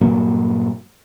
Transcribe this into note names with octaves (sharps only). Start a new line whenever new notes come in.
G2 A#2 F#3 A#3